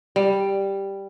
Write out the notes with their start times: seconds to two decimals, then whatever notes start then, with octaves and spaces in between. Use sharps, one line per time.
0.16 G3